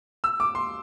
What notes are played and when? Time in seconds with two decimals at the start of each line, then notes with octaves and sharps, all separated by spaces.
0.24 E6
0.40 D6
0.55 C6